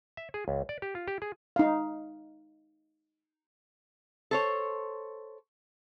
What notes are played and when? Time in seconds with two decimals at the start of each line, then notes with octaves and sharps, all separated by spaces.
0.17 E5
0.34 G#4
0.48 C#2
0.69 D5
0.82 G4
0.95 F4
1.08 G4
1.22 G#4
1.56 D#4 F5
4.31 A4 C5 C#5